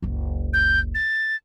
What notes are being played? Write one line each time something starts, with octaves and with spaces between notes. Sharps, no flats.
F#1 C#2
G6
A6